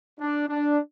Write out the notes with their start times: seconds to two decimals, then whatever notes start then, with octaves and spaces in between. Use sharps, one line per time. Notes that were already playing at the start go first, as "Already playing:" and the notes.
0.20 D4
0.49 D4